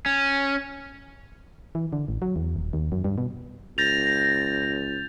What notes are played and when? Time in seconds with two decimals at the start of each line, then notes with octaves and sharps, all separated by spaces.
0.06 C#4
1.75 E3
1.93 D3
2.08 A1
2.22 F#3
2.36 E2
2.56 D#1
2.73 D#2
2.92 F#2
3.04 G2
3.18 B2
3.78 C#2 G6 A6 A#6 F7